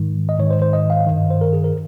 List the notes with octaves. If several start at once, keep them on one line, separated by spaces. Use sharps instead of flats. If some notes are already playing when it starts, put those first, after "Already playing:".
Already playing: G#2 D#3
D#5
G#2 D#3 C#5
C5
C5
D#5
F5
G2 D#3
C5
A#4
G#4
A#4